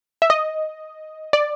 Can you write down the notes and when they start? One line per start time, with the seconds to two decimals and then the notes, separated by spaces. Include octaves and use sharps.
0.22 E5
0.30 D#5
1.33 D5